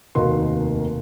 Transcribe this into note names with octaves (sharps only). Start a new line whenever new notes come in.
F1 D#2 D#3 A#3 F#4 C6